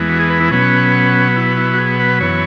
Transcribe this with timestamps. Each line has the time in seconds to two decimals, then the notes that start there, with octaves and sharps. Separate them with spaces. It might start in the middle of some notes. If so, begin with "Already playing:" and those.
Already playing: E2 E3 G#3 B3
0.09 F#4
0.19 G#4
0.30 B4
0.40 E4
0.51 B2 F#3 B3 C#4
1.36 E4
1.57 E4
1.74 F#4
1.78 G#4
2.00 B4
2.21 F#2 E3 B3 C#5